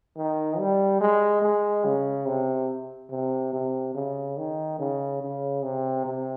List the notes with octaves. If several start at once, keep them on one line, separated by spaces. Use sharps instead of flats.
D#3
G3
G#3
G#3
C#3
C3
C3
C3
C#3
D#3
C#3
C#3
C3
C3